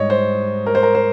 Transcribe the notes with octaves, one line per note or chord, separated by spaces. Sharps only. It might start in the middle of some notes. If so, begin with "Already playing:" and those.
Already playing: G#2 G3 C#5 D#5
C5
A#4
C5
A#4
C5